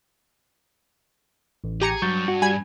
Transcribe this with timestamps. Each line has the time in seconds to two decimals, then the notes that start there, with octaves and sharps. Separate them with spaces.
1.64 A1
1.81 G4 G#4 A#5 C#7
2.02 G2 F#3 C#6 G6 A6
2.28 F#4
2.42 G3 G#5 B5 G#6